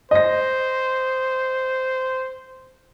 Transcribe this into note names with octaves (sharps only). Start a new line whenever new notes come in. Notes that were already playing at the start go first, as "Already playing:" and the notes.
C5 D#5 A#6